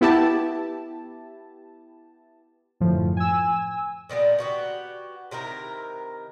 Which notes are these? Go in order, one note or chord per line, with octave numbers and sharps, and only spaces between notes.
B3 E4 G4 A5
F#2 A2 D3 F3
G#5 E6
A#2 D#3 G3 B3
B3 F#4 G4
C3 D#3 E4 A#4